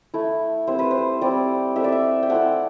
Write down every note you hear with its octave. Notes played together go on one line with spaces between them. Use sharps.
A3 E4
G3 C4 E4 C5
B4
C5
G3 C4 E4 D5
A3 C4 E4 E5
D5
E5
G5
A3 C4 E4 F#5